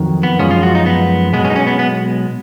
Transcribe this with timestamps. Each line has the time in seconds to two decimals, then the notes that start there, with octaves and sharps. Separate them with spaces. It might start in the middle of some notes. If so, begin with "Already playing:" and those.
Already playing: F2 D#3 F#3
0.23 B3
0.39 F#2 F3 G#3 C#4
0.51 F4
0.63 F#4
0.75 D#4
0.86 B3
1.33 B1 B2 G#3 B3
1.45 C#4
1.50 D#4
1.56 C#4
1.67 B3
1.79 B3